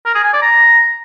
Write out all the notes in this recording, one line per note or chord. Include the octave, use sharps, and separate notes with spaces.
A#4
G#4
G#5
D5
A#5